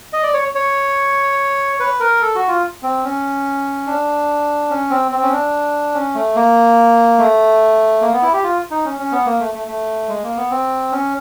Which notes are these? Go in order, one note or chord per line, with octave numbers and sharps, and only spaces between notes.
D#5
D5
C#5
C#5
B4
A#4
A4
F#4
F4
C4
C#4
D4
C#4
C4
C4
C#4
D4
C#4
A3
A#3
A3
A#3
B3
E4
G4
F4
D#4
C#4
C#4
B3
A#3
A3
A3
A3
G#3
A#3
B3
C4
C#4